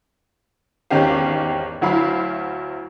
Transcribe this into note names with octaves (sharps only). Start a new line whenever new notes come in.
G#1 E2 D#3 C#4 G4 F5
D2 F#3 E4 F5 B5